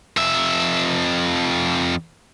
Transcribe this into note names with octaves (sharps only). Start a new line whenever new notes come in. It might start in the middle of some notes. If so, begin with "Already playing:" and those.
F2 E5